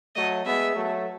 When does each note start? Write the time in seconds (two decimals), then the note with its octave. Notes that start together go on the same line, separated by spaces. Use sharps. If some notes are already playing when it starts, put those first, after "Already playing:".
0.15 F#3 A3 D#5
0.45 G#3 B3 E5
0.75 F#3 A3